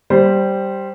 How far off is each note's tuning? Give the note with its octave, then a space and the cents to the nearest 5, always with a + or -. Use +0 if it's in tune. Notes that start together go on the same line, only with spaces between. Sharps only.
G3 -5 C5 +5